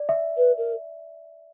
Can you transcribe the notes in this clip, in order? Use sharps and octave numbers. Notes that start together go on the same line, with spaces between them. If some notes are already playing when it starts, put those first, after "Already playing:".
Already playing: D5
E5
B4
A#4